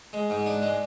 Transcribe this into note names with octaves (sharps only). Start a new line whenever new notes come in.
G#3
G#2
D4
G#3